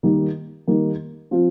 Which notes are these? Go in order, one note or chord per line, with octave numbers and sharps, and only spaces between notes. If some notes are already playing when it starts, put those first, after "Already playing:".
D#3 G3 A#3 D#4
D#3 G3 A#3 D#4
F3 C4 F4